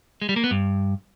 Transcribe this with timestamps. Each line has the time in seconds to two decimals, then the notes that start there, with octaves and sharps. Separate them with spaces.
0.22 G#3
0.29 G3
0.36 A#3
0.44 B3
0.51 G2